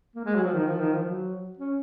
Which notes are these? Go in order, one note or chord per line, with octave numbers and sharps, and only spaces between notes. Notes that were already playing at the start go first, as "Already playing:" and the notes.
A#3
G#3
F#3
F3
D#3
F3
D#3
F3
F#3
C#4